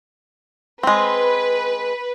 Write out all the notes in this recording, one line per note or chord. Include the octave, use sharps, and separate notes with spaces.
G#3 C4 B4